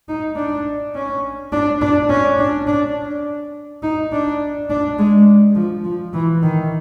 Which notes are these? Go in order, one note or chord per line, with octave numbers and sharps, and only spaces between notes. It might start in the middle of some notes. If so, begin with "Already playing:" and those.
D#4
D4
C#4
D4
D4
C#4
D4
D4
D#4
D4
D4
G#3
F3
F3
E3
D#3